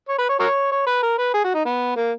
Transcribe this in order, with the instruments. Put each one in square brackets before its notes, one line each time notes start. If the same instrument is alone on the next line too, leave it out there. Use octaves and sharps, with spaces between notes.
[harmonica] C#5
B4
C#5
F#4 A#4 C#5
C#5
B4
A#4
B4
G#4
F#4
D#4
B3
A#3